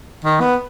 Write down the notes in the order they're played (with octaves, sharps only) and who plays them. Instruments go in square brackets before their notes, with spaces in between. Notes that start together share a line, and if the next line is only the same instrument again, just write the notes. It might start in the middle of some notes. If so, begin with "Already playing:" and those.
[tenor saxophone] D#3
B3